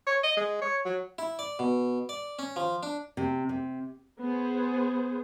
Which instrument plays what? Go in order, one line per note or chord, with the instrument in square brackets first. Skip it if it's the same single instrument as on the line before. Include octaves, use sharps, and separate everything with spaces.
[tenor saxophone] C#5
D#5
G#3
C#5
F#3
[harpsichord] E4
D5
B2
D5
C#4
F3
D4
[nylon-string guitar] C3
C3
[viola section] B3 G#4 C5